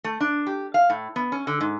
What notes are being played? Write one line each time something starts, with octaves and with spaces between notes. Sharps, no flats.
A3
D4
G4
F5
A2
B3
C#4
D3
G#2